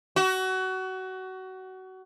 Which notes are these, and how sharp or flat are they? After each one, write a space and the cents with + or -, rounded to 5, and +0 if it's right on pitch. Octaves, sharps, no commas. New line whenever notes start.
F#4 +25